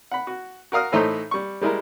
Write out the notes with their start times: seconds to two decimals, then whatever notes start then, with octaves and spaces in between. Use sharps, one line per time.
0.12 F#5 B5
0.27 F#4
0.72 F#4 A#4 F5 D#6 F6
0.92 A2 E3 A3 D#4 C5 A#5
1.31 G3 C#6
1.61 G3 G#3 E4 A#4